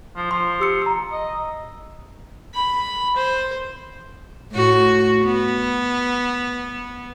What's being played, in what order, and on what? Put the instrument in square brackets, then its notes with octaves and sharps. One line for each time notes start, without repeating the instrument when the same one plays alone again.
[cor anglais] F3
[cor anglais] F3 [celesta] C6
[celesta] G4 E6 C#7
A#5 E6
[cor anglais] D#5
[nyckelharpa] B5
C5
[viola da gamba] A2 F#4
B3